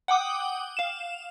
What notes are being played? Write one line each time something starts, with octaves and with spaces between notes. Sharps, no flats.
F#5 G5 D6 D#6
F5 E7